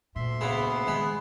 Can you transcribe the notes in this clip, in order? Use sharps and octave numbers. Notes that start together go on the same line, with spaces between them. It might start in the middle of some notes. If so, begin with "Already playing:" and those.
D2 A#2 E5 C6
C#3 G#3 B3
D#3 F3 G#3